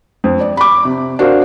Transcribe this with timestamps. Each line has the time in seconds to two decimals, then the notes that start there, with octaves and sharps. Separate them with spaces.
0.24 F2
0.41 D5
0.57 B5 D6
0.85 C3
1.19 D4 F#4 A#4 C5 F5